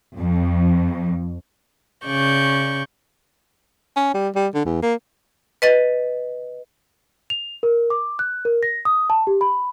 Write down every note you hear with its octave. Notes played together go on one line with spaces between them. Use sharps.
F2
C#3 D5 C#6 G6
C#4
G3
G3
D3
E2
A#3
B4 D#5 A6
F7
A#4
D6
F#6
A#4
A#6
D#6
A5
G4
B5